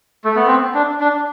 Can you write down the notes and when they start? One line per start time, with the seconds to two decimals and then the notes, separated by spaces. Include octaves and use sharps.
0.25 A3
0.36 B3
0.47 C4
0.74 D4
1.00 D4